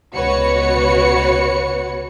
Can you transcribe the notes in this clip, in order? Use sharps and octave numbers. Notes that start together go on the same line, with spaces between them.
C#2 B2 F#4 B4 C#5 C#7